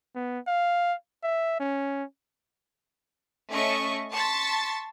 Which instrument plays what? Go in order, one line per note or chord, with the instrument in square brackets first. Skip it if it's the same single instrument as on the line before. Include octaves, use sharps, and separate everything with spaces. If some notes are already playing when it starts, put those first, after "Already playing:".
[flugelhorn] B3
F5
E5
C#4
[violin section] A3 C#4 D#5 C#6
A5 C6 C#6 A6 B6